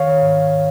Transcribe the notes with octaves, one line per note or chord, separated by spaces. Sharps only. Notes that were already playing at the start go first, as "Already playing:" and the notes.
Already playing: D#3 C#5 F5
G#2